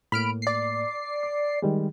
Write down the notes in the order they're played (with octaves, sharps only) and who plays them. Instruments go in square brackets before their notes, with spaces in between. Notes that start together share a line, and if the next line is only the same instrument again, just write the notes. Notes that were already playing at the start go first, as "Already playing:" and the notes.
[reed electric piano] A2 A#3 [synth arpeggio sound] B5 F6 D7
[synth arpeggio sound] D5 C7
[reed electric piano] D6
D#3 G3 G#3